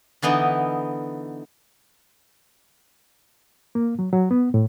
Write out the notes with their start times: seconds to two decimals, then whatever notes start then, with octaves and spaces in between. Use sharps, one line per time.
0.22 D3 E3 B3 D#4
3.75 A#3
3.99 F#3
4.13 F#3
4.31 B3
4.54 A2